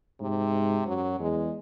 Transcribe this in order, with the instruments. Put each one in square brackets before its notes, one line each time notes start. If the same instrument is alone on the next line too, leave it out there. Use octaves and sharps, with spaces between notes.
[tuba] G#2 [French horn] C3
[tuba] F#2 [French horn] F#3
[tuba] E2 [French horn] G#3